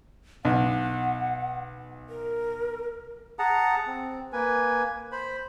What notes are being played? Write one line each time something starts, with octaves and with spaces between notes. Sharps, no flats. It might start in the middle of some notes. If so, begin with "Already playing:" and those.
B1 F#5
A#4
G#4 F#5 A5 A#5
C4
A#3 B4 G#5
C5 B5